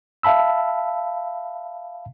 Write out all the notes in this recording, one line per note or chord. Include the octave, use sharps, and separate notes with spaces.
E5 F5 A5 B5 E6